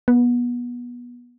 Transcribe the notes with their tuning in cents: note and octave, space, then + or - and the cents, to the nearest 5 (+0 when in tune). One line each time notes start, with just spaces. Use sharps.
B3 -25